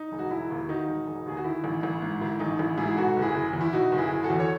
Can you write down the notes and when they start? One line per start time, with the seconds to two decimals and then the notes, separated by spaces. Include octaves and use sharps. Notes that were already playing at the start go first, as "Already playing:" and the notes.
Already playing: D#4
0.12 E1
0.19 F#4
0.31 E1 E4
0.50 D#2
0.69 D#3 D#4 F#4
0.88 E1
1.06 E1
1.26 D#2 G#4
1.37 F#4
1.44 D#3 E4
1.64 A1
1.83 A1
2.02 G#2
2.20 D#3 E4
2.39 A1 D#4
2.59 A1 E4
2.77 G#2 E4 G#4
2.88 G#4
2.97 B2 F#4 A4
3.16 F#1
3.22 E4 G#4
3.35 F#1
3.53 E2
3.61 E4
3.73 B2 D#4 F#4
3.92 F#1
3.98 E4 G#4
4.10 F#1
4.23 F#4 A4
4.30 E2
4.39 C#5